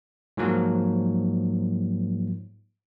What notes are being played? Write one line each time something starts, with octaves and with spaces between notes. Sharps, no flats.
G#2 F3 F#3 A#3